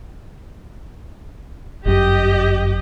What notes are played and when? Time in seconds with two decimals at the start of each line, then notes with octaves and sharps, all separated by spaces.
1.85 G1 F#2 G4 D#5